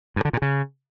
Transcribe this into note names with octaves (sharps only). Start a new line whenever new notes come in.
G2
D3
A#2
C#3